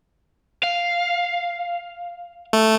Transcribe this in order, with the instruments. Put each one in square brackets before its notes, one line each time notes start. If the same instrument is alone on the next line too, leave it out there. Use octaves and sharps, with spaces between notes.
[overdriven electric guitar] F5
[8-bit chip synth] A3